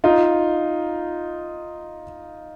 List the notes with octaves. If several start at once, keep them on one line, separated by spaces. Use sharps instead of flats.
D#4 F4